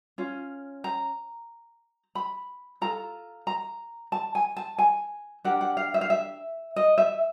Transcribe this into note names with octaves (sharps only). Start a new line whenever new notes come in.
C#4 F4
A#5
B5
F4 A4 A#5
A#5
A5
G#5
A5
G#5
D4 G4 A#4 F#5
F#5
F5
E5
F5
E5
D#5
E5